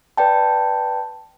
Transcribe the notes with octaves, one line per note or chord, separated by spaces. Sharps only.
B4 D5 G5 A5